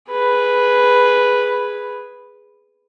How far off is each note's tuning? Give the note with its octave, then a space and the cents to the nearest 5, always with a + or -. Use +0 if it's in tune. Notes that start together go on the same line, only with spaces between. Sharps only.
G#4 +0 B4 +0